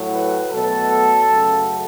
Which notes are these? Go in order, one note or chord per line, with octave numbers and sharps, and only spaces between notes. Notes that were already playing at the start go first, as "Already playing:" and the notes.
Already playing: A2 F#3 A3
B4
B2 F#3 A3 A4
F#2 C#3 F#3 A3